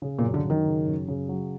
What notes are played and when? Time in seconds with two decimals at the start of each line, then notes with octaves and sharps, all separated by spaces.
0.02 C#3
0.19 A#2
0.24 F#2
0.34 D3
0.44 F#2
0.50 D#3
0.66 C#3
0.87 F#2
1.08 C#3
1.29 F#3